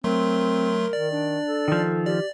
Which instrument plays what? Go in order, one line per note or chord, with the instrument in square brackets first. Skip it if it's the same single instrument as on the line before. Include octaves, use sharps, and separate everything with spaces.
[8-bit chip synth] F#3 A3 C6 [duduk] C4 [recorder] A#4
[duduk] D#3 [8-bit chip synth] D5
[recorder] D4
[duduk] A4
[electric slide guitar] D#3 F3
[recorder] G4 [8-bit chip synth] D5